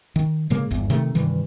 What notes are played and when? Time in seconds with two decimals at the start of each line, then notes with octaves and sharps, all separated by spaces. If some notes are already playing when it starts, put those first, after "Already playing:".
0.16 D#3
0.50 A2 C#3 G#3 A#3
0.71 G1 E2
0.90 C3 D#3 A3
1.15 G2 C3 D#3 E3